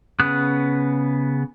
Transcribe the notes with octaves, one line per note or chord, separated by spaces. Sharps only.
C#3 B3 D#6 F#6